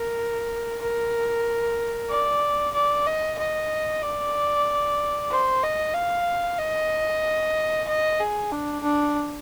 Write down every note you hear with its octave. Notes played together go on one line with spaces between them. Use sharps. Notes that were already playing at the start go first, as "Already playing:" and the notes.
Already playing: A#4
A#4
D5
D5
D#5
D#5
D5
C5
D#5
F5
D#5
D#5
G#4
D4
D4